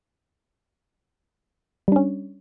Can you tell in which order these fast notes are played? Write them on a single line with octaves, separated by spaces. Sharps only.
G3 D4 C#4